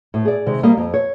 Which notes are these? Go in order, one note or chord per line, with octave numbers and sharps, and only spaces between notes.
A2
G#4 D5
C3 D#3 G#3
G3 A#3 D#5
F2
C#5